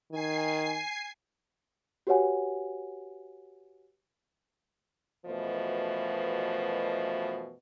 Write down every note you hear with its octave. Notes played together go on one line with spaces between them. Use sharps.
D#3 G#5 C7
F#4 G4 B4 C#5 F#5 G#5
F#2 B2 E3 F3 A3 D#5